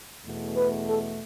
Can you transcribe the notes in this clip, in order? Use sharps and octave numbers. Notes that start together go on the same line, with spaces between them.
E2 B2 A3
B4
A4